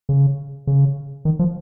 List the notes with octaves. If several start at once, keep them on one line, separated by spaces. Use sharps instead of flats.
C#3
C#3
D#3
F3